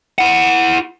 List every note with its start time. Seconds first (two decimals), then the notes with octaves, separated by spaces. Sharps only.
0.18 E4 F#5